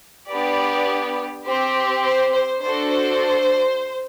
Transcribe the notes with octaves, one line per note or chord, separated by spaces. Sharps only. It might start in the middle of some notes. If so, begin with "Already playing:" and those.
B3 D4 G4 D5
C4 G4 C5
C5
C5
D4 F#4 A4 C5
C5